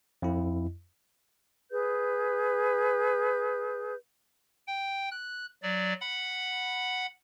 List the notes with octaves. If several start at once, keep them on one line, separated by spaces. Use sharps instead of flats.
F2 E4
G#4 B4 G6
G5
F#6
F#3 D5
F#5 B5